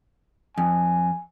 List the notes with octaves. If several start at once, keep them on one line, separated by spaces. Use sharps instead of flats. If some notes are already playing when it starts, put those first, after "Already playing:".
F2 G#5